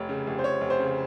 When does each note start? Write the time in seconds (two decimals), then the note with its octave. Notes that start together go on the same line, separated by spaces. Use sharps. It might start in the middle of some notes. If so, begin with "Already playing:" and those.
Already playing: F1 C#5
0.09 C#3
0.27 F1
0.39 C5
0.44 F1 C#5
0.61 F1
0.70 C5
0.79 C#3